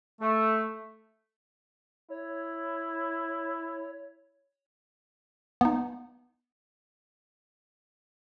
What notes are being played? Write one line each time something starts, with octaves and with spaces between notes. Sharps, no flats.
A3
E4 C#5
B3 D#4